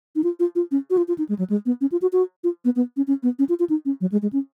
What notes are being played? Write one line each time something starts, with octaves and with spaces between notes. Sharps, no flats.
D#4
F4
F4
F4
C#4
F#4
F4
F4
D#4
G#3
F#3
G#3
B3
C#4
F4
F#4
F#4
F4
B3
B3
C#4
C#4
B3
C#4
F4
F4
D#4
C#4
F#3
G#3
G#3
C#4